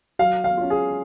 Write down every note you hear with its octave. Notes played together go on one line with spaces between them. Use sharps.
F#3 F5
F5
C#4 F4
G#4